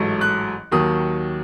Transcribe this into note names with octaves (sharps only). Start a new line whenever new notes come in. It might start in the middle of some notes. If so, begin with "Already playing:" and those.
Already playing: A1 G#2 F#3 A3
F#6
D#2 D#3 F#3 D#6